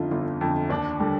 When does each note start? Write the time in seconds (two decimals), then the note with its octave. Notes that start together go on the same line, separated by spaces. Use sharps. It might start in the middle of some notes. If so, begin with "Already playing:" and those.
Already playing: G1 F2 D3 D#4 F4
0.11 G1 F4
0.41 F2 D3
0.70 D#2 D4
1.00 D3 G3